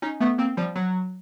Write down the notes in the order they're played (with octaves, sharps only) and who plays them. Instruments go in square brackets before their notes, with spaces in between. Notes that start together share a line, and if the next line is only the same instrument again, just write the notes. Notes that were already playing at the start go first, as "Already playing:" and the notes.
[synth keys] C#4 D#4
A3 B3
A#3 C4
F3 G3
F#3